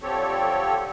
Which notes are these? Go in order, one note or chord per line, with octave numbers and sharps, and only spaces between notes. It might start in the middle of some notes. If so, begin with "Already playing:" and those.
D3 F3 C4 G4 A4 C#5